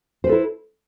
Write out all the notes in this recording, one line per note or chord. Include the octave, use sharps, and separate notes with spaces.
E4 A4 B4 C5